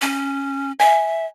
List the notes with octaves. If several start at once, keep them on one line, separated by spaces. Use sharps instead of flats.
C#4
E5 G#5